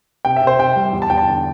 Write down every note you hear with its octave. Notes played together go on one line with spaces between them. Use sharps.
C3 G5
C3 E5
C5
C3 G5
G3
E2
A5
E2 G5
A5
D3